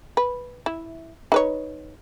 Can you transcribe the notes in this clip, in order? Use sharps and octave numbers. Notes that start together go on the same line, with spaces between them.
B4
E4
D#4 B4 C#5